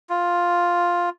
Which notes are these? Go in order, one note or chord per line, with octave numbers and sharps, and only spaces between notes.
F4